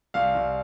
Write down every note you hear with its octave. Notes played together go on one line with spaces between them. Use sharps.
C2 F5
C2